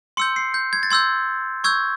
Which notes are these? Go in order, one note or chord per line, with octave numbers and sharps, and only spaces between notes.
C6 E6 G6 C#7
C7
G6
G#6
A6
C6 E6 G6 G#6
C#6 E6 G6 G#6